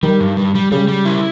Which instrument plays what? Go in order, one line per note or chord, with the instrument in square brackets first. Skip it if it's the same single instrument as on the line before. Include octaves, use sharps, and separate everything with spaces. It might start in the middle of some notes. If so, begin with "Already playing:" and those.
[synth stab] D#3 [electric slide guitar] G3
[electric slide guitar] G2
G3
G3
[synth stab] C#3 [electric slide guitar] G3
[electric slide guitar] G3
E4